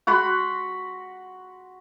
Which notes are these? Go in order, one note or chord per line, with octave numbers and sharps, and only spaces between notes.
F#4 F#5 B5 C6